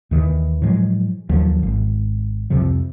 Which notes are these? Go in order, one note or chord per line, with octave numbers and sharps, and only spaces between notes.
D#2 D#3 E3
A2 F3 F#3 G#3
D#2 D#3 F3 F#3
G#1
C2 F2 C3 F3